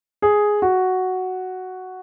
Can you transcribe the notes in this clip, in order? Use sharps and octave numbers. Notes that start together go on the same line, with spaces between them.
G#4
F#4